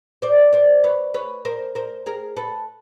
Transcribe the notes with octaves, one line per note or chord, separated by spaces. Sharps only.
C5 D5
C5 D5
B4 C#5
B4 C#5
A#4 C5
A#4 C5
G#4 A#4
A4 B4